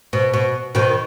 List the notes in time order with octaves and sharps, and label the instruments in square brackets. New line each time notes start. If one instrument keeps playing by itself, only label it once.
[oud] B2
B2
B2 D#3